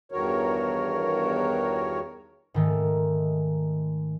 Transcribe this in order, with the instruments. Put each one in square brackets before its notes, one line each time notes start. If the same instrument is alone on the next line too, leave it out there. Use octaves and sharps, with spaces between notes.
[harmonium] E2 G2 D#3 F#4 A#4 C#5
[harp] G#2 D#3 A3